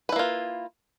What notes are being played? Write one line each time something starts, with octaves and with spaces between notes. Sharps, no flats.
A#3 E4 F4 B4